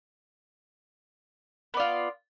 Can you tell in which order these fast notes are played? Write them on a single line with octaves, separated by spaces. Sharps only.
B3 D5 F4